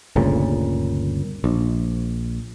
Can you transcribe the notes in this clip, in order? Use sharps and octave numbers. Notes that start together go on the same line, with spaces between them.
G1 D2 A#2 C#3
A#1